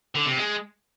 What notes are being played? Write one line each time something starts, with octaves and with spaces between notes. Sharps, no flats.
D3
C3
G#3